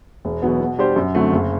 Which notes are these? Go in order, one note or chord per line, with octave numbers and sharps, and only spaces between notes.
E1
E2 B2 F#3 B3
B2
G3 D4 G4 C5
F#2
D3 F#3 A3 C4
F#1